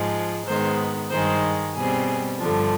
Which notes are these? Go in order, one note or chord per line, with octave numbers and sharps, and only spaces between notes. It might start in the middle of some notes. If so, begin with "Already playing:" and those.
Already playing: G#2 F3 G#3
G#2 D#3 G#3 B3 C5
G2 D#3 G#3 C5
B2 G3 C4 G#4
G2 D3 F3